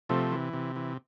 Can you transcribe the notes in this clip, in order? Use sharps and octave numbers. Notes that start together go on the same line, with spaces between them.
C3 F3 A3
E3
C3
E3